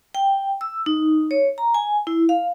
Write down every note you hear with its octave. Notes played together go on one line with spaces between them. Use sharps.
G5
E6
D#4
C#5
A#5
G#5
E4
F5